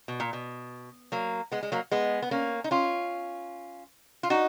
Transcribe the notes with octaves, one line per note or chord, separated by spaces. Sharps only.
B2
A#2
B2
F#3 A#3
G#3 B3
G#3
F#3 A#3
G#3 B3
B3
A#3 C#4
D#4
C#4 F4
F4
D#4 F#4